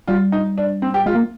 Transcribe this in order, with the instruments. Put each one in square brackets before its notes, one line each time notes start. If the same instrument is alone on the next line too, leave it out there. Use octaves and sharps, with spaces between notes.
[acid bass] G3 [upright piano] F4
[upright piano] D#4
D4
C4
G4
[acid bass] G#3 [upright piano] F4
[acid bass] A#3